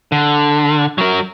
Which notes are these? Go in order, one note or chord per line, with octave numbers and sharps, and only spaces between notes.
D3
F#3 A#4